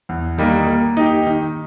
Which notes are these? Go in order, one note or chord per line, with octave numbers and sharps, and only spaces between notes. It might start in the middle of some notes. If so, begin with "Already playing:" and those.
E2
D#3 G3 A#3 D#4
A#3
D#4 G4
D#3